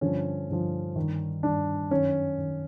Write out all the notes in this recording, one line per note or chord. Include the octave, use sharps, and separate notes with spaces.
G2 D3 F3 C#4
G2 D3 F3
G2 D#3
G2 D#3 D4
F#2 D#3 C#4
D#3